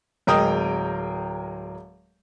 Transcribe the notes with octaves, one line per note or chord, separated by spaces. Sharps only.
D1 G#3 A#4 D#5 G5 D#6